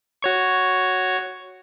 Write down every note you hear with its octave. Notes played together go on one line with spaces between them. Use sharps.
F#4 C#5 C#6